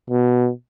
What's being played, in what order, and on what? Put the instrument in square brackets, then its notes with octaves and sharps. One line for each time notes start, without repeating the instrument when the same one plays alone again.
[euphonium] B2